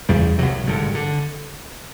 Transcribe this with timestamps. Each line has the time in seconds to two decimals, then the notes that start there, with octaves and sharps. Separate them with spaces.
0.09 F#1 E2 C#3 G3
0.38 C2 C3 F#3
0.66 G#1 G2 D3
0.95 D3